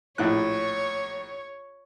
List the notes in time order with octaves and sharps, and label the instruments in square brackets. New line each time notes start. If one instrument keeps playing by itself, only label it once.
[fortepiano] A#1 A2 F#6 [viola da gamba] C#5